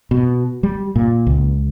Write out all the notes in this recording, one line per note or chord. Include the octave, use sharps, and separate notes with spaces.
B2
G3
A#2
C#2